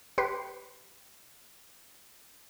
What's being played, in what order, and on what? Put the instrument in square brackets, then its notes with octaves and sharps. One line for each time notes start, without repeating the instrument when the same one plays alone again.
[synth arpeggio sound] G4 B4 C6